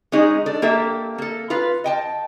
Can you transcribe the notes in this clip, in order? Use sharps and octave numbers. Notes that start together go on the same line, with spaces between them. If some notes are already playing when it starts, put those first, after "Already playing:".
G#3 C#4 D#4 G#4
D4 A4
A#3 G4 A4 E5
A#3 A4
F4 B4 F5
D#5 G5 A5